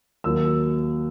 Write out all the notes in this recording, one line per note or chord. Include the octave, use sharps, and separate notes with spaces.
D#2 D#3 F#3 E6